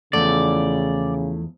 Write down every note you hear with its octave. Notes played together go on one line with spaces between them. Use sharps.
E2 C#3 F3 A3 E4 D5 F#5